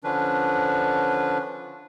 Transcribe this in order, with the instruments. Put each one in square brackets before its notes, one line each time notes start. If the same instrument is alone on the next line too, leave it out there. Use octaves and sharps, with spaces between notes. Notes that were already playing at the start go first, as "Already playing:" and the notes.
[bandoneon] D3 F3 C#4 D4 B4